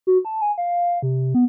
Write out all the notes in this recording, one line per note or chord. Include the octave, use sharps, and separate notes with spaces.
F#4
A5
G#5
F5
C3
B3